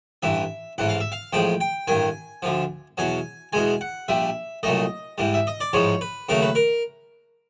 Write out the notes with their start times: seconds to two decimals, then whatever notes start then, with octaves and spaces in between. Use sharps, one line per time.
0.23 A1 G2 E3 E5
0.78 A1 G#2 E3 F#5
0.89 F5
1.01 E5
1.12 F5
1.33 A1 A2 F3 G#3 G5
1.60 G5
1.88 A1 G2 D#3 G#5
2.42 D2 D3 F3
2.98 E2 B2 F#3 G#5
3.53 E2 B2 G#3 G#5
3.81 F#5
4.08 A#1 A#2 G3 E5
4.63 C2 A#2 F#3 A3 D#5
5.18 G#2 E3 G3
5.34 E5
5.47 D#5
5.60 D5
5.73 A1 G#2 F3 G#3 C#5
6.01 B4
6.29 D#2 C#3 F#3 A3 A#4
6.42 B4
6.55 A#4